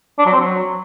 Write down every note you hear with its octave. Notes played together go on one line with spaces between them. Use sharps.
D4
F#3
C4
F#3